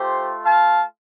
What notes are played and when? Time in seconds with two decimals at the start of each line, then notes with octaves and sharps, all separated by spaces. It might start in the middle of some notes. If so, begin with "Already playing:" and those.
Already playing: A3 F4 G4 C5
0.44 F5 A5